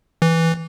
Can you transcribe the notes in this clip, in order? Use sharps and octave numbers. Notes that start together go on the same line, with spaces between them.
E3